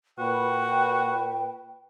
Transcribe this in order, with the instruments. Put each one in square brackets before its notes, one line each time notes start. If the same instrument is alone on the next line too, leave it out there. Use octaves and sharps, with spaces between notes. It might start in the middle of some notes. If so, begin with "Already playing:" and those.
[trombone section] A#2 B4 [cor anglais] F#4 [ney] G5